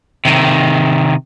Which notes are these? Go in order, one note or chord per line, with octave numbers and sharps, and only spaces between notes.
C3 D#3